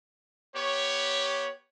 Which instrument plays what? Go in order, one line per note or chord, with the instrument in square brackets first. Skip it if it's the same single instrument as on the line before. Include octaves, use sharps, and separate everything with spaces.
[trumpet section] B3 G4 C#5